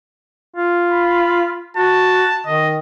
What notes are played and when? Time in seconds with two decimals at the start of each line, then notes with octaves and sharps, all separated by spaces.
0.56 F4
0.91 B5
1.77 F#4 A5
2.46 D#3 D#5